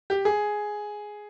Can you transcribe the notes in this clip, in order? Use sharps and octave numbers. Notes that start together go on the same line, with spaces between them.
G4
G#4